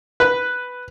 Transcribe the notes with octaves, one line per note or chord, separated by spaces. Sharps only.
B4